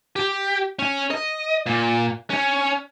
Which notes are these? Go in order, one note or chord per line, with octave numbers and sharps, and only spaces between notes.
G4
C#4
D#5
A#2
C#4